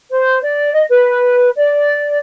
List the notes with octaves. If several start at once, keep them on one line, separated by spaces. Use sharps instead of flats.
C5
D5
D#5
B4
D5